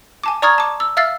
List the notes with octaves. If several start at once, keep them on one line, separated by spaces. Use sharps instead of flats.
G#5 A5 D6
D5 A#5 C#6 D#6 F6 G#6
A5 D6
E6
E5 F5 E6 F6 A6 C7